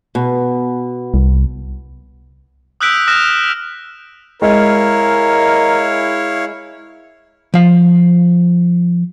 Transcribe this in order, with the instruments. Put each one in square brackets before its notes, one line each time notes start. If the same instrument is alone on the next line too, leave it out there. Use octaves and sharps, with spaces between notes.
[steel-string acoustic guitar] B2
[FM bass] C2
[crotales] D#6 E6 F#6 G6 B6 D7
D#6 F6 F#6 A#6 E7
[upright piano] G#3 [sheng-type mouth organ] E4 C#5 F5 [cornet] A#4
[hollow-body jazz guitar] F3 F5